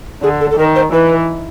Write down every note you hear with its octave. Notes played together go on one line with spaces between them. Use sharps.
D3 G#4
A4
A4
D#3 A#4
C5
E3 B4